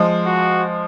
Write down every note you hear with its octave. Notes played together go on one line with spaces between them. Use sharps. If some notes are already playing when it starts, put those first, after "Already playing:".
Already playing: F3 G#3
F#4